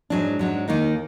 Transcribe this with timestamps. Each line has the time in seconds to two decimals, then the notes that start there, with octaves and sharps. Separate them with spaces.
0.10 G#2 F#3 D4
0.39 G#2 F#3 D4
0.68 D#2 D#3 A#3 D#4